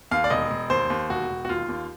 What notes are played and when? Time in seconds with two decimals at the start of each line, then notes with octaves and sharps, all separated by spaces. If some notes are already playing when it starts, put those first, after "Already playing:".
0.11 D#2 F5
0.24 D5
0.30 E1 D#5
0.51 E1
0.70 D#2 C5
0.90 D#2
1.10 E1 F#4
1.29 E1
1.45 F#4
1.49 D#2 F4
1.69 D#2